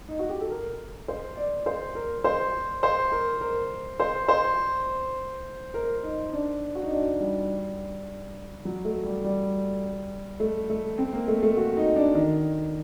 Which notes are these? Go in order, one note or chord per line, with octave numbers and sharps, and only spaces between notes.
D#4
F#4
G4
A4
A#4
C5
D5
C5
A#4
C5
C5
A#4
A#4
C5
C5
A#4
D#4
D4
F#4
D#4
D4
G3
F#3
A3
G3
G3
A3
A3
C4
A#3
A3
A3
F#4
D#4
D4
D#3